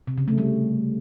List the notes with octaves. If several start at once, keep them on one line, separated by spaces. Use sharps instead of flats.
C3
C#3
A3
G3